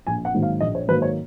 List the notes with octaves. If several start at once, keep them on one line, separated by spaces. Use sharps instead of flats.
A#1 G#5
F#5
G#2 D#3 F#3 A#3
F5
A#1 D#5
C#5
G#2 D#3 F#3 A#3 B4
C#5